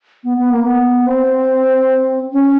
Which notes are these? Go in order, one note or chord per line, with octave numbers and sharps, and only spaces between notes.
B3
B3
A#3
B3
C4
C#4